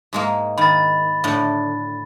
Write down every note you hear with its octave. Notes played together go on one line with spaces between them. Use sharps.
G#2 G#3 A#3
D#3 B5 A6
A2 D3